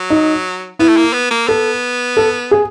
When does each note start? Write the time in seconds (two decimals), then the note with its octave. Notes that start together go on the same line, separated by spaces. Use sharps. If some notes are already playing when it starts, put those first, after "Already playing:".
Already playing: F#3
0.10 D#4
0.79 B3 E4
0.88 A3
0.97 A#3
1.13 B3
1.31 A#3
1.48 B3 A4
2.17 A4
2.51 G#4